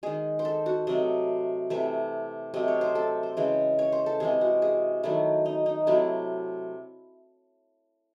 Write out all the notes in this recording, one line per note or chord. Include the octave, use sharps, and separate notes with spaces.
D#3 G#3 G#4
C5
A4
F#4
C3 F#3 A3 D#5
C3 E3 A3 E5
C3 F#3 A3 D#5
C#5
C5
A4
C5
C#3 E3 G#3
C#5
C5
A4
C3 E3 G#3 G#4
F#4
G#4
D#3 F#3 A3 E4
D#4
D#4
C3 F#3 A3 E4